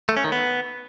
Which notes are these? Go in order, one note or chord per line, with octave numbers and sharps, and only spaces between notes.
A3
C#4
D#3
B3